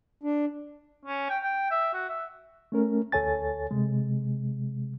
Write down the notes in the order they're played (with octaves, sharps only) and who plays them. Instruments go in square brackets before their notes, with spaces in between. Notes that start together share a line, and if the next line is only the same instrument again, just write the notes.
[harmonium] D4
[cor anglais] C#4
G5
G5
E5
F#4
E5
[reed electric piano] A3 C#4 A#4
D2 A4 C#5 G#5 A6
C3 G#3